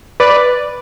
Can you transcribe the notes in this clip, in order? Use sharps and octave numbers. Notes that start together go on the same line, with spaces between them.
B4 D5